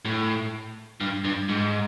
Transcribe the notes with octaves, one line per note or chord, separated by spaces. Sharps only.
A2
G2
G2
G#2